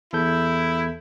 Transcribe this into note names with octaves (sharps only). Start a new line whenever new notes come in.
E2 E4 A4 G6